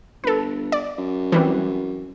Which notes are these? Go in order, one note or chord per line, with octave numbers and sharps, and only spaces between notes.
G1 A4 B4
D5
F#2
E3 G3 C4